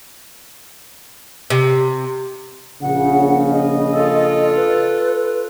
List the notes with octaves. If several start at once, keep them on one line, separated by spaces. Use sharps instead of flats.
C3
A#1 C#3 F#5
D#5
F4 A4
B4